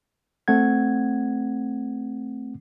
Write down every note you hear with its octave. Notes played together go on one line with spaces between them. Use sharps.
A3 C4 F#5 G#6